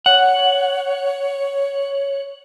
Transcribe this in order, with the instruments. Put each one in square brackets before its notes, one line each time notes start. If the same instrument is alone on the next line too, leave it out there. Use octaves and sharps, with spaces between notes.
[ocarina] C#5 [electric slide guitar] F#5